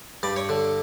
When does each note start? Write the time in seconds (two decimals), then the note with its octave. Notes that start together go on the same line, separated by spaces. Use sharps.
0.23 G2 D5
0.36 C#5
0.49 D3